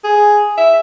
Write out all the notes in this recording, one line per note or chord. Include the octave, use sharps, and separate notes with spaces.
G#4
E5